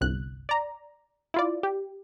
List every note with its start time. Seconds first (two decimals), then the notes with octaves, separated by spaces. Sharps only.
0.01 G1 C2 F#6
0.49 D5 A#5
1.34 E4 F4 D5
1.63 G4